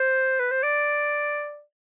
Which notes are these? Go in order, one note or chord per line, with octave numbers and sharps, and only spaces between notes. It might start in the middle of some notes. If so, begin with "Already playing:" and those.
Already playing: C5
B4
C5
D5